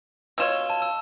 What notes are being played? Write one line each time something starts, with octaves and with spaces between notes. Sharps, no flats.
B2 F4 C#5 E6 E7
A5
E6